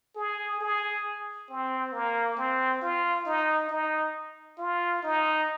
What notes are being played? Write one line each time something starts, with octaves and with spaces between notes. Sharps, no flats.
G#4
G#4
C4
A#3
C4
F4
D#4
D#4
F4
D#4